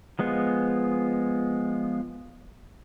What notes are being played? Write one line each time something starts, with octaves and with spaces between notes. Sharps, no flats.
F3 G#3 B3 F4